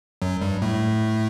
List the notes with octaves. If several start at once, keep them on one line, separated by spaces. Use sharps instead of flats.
F#2 F#3
G2 G3
A2 A3